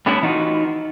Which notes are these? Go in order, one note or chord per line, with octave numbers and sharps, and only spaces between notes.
G3 A3 B3 C#4 D4 E4
E3 D#4 F4 F#4